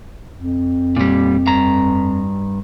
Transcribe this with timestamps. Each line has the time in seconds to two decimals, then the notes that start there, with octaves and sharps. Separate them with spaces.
0.35 F2
0.97 A#2 G3
1.47 G2 A#5